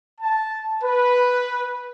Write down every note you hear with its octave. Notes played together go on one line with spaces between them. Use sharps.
A5
B4